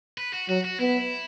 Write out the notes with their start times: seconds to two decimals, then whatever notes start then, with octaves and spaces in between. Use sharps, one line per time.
0.18 B4
0.33 F#4
0.49 F#3 F#4
0.64 F#4
0.80 B3 E4